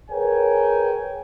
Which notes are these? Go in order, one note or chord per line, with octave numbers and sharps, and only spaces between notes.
G#4 A#4 B4 C#5 G5 G#5